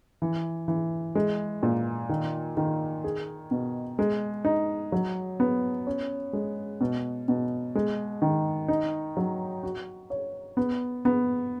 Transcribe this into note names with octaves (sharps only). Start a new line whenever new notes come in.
E3
E3
G#3
A#2
D#3
D#3
G#4
B2
G#3
D#4
F#3
B3
C#4
G#3
B2
B2
G#3
D#3
D#4
F#3
F#4
C#5
B3
B3